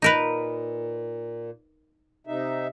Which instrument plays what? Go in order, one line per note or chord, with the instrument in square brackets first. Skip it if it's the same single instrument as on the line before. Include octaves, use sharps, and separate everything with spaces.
[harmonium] A#2 [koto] D#4 A#4 B4
[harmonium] C3 D#4 E5